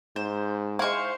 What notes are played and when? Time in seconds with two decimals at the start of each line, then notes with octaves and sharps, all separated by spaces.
0.16 G#2 C5
0.79 G#3 E4 C5 F5 C#6